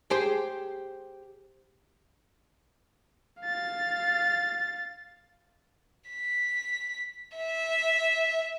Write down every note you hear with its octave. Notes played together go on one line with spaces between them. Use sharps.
G4 G#4 C5
F5 A6
B6
E5